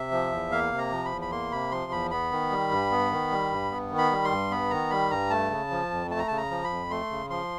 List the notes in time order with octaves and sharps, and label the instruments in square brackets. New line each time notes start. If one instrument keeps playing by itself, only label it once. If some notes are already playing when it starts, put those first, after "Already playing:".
Already playing: [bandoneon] C3 E5
F3
E2
A#3 F5
C3
A#5
F3
B5
E2
B5
A#3 C6
C3 B5
F3 C6
E2 B5
B3 B5
D#3
G3
G2
B3
D#3
G3
G2
B3
D#3
B5
G3
C6
G2
B3 B5
D#3 A#5
G3 B5
G2 A#5
A3 A5
C#3
F3
F2
A3 A5
A#5
C#3 A5
A#5
F3
B5
F2
A3 C6
C#3
F3 C6